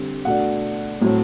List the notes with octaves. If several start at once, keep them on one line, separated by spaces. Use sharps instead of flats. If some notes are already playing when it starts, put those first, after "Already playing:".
Already playing: D3 G3 C4
B2 A3 D4 F#5
A2 F#3 C4